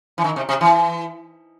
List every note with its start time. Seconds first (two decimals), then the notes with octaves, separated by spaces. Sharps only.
0.18 E3
0.24 D#3
0.36 C3
0.49 C3
0.61 E3